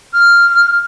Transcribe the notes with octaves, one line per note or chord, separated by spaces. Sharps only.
F6